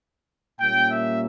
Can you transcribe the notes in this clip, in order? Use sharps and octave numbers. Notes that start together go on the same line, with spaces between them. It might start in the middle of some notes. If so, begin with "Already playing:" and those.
A#2 G3 A#3 C#4 G5
E5